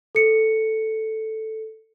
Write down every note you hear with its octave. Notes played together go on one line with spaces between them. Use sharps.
A4 C#7